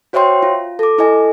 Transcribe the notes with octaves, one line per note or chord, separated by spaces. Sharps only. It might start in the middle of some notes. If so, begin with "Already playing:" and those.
F#4 C5 C#5 E5 G5 C6
F4
A4 D6
E4 A4 D#5 G#5